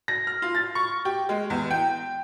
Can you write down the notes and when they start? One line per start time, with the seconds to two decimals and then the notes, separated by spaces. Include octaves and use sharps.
0.08 A#6
0.27 F6
0.42 F4
0.55 A6
0.75 C#6
1.05 G4
1.29 G#3
1.50 E2
1.71 G5